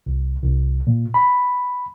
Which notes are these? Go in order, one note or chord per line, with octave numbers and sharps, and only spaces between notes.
C2
C2
A#2
B5